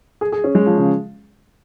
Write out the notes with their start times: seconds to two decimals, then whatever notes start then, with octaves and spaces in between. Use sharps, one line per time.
0.21 G#4
0.32 G#4
0.44 C#4
0.55 G#3
0.66 F3
0.78 C#3